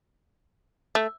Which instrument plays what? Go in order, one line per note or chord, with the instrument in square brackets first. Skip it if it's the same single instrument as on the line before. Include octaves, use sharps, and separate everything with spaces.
[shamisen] A3